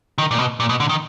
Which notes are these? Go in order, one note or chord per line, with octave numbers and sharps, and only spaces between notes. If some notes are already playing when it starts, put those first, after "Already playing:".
D#3
A#2
B2
A#2
B2
D3
D#3